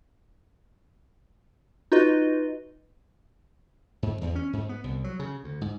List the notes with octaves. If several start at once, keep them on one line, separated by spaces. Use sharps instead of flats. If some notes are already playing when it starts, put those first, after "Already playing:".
D#4 F4 F#4 B4 D#5
G#2
E2
C#4
G#2
B3
C2
F#3
C#3
D2
G#2